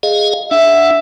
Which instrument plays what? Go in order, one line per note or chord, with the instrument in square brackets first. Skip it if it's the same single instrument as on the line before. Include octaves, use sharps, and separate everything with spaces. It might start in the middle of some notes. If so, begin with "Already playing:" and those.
[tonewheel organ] G#4 D#5 F5
[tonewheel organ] D4 F#5 [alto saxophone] E5